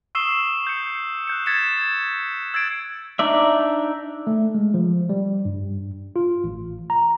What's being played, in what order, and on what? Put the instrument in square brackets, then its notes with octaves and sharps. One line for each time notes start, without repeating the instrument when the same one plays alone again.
[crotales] C#6 D#6 E6 C7 E7 G7
G6 C#7
F#6 G6 C#7
G#6 A6 B6 C#7 E7
E6 G#6 A6 C7 D7
[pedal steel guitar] D4 D#4 D5 E5
[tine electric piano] A3
G#3
F3
G3
G2
F4
A1
A#5